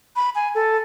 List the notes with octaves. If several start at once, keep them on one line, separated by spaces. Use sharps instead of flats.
B5
G#5
A4